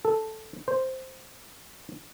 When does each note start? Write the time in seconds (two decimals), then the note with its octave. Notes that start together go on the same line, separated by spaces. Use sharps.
0.05 A4
0.68 C5